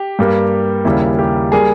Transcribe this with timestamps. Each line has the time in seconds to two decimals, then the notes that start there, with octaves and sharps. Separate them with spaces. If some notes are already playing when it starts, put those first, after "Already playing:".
Already playing: G4
0.19 G2 G3 A#3
0.85 D#2 C#3 G3 A#3 E4
1.19 G4
1.52 G3 A#3 G#4